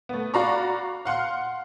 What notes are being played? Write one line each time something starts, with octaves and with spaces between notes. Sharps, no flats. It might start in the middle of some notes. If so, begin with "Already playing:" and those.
A3 B3
F#4 D5 F5 A#5 B5 C#6
F5 F#5 C6 F6